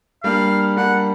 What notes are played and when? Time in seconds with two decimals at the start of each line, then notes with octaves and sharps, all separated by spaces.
0.23 G3 A#3 D4 F5
0.77 G3 A#3 D4 F#5